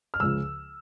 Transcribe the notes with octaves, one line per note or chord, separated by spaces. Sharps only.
F6
C#2 C#3 F3 E6